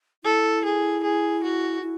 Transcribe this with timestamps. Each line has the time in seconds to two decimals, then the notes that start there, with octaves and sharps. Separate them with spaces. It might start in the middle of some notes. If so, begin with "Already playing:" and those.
0.24 E4 A4
0.64 G#4
1.03 G#4
1.43 F#4
1.82 E4